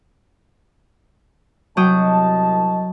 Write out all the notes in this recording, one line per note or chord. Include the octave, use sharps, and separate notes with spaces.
C2 F#3 D#5 G5 A5 D#6